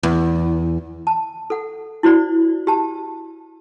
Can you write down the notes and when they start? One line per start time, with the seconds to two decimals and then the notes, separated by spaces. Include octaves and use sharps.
0.03 E2
1.07 A5
1.50 A4 F#5
2.03 E4 F#4 C5 D5
2.67 G4 A5